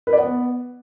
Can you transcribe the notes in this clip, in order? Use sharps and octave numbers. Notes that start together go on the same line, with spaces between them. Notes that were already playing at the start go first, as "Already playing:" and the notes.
B4
D5
B3